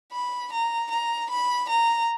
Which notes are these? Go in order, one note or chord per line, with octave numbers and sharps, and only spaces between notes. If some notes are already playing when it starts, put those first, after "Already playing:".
B5
A#5
A#5
B5
A#5